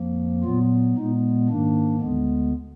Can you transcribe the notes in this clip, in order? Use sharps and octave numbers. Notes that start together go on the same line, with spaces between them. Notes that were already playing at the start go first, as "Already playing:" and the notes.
Already playing: F2 F3 A#3
A#2 F#3 B3 F4
A#2 G#3 B3 D#4
G#2 D#3 A#3 D4
D2 D3 G#3 B3